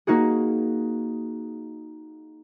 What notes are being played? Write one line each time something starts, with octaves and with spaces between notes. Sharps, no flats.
A#3 D#4 F#4 G#4